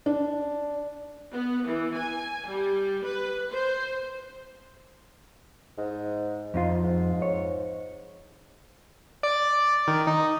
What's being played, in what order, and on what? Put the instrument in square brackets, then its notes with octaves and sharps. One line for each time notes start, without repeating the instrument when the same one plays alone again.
[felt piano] D4
[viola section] B3
E3
G#5
G3
B4
C5
[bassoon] G#2
[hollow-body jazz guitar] F2 D#4 F4
[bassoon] G#2
[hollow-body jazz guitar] C#5
[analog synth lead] D5
D#3
D#4